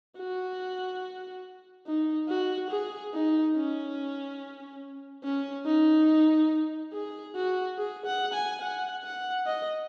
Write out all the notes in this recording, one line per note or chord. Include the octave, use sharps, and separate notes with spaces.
F#4
D#4
F#4
G#4
D#4
C#4
C#4
D#4
G#4
F#4
G#4
F#5
G#5
F#5
F#5
D#5